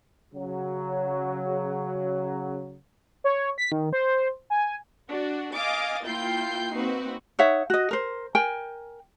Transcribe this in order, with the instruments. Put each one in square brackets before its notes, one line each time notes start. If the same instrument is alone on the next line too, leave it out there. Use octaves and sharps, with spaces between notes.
[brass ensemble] C#3 F#3
[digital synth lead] C#5
B6
D#3
C5
G#5
[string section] D4 F#4 D5
D#5 F5 G#5 D6 A6
A#3 E4 F4 G5 G6 C7
A#3 C4 D#4 F#4 B4
[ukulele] D#4 C#5 E5 F#5
F#4 D#5
A#4 C5
A#4 G5 G#5